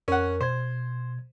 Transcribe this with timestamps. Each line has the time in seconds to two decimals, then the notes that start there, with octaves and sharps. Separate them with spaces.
0.08 F2 C#4 A#4 F#5
0.41 B2 C5 G#6